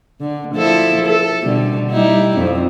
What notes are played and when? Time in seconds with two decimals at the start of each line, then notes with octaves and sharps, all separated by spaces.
0.20 D3
0.54 F3 E4 A4
1.06 A4
1.43 B2 D3 G3
1.91 G3 D#4 E4
2.38 F2 F3